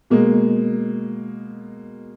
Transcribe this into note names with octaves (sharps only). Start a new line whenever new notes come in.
B2 G#3 A#3